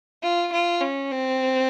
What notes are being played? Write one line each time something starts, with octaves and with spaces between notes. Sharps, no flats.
F4
F4
C#4
C4